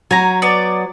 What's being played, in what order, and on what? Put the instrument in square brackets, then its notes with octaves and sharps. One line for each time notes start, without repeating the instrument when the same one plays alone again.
[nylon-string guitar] F#3 [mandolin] G#5 A#5
[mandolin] B3 D5